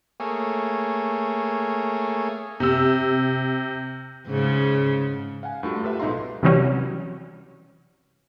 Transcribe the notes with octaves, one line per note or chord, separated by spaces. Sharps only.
A3 A#3 G#4 C#5
C3 E6
G#2 C#3
F5 F#5 G#5
G2 A3 F4 F#4
G4 A4 B4 E5
B1 G#2 D#4 F5 A#5 C6
C3 E3 F#3 G3 C#4